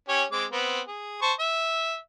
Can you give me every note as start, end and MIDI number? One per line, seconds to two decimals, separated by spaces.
0.09 0.24 61
0.09 0.24 67
0.09 0.24 73
0.32 0.46 56
0.32 0.46 60
0.32 0.46 86
0.52 0.81 59
0.52 0.81 60
0.88 1.18 68
1.22 1.33 72
1.22 1.33 81
1.22 1.33 85
1.40 1.97 76